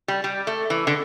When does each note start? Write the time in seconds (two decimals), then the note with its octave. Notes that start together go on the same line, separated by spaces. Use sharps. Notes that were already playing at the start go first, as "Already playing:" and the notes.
0.08 G3
0.24 G3
0.47 A3
0.70 E3
0.87 D3